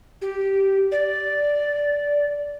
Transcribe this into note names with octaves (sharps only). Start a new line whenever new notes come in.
G4
D5